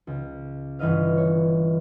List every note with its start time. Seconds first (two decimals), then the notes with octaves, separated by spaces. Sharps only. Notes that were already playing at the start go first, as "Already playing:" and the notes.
0.07 C#2
0.79 G1 E3 B4 D#5 F5
1.17 C#5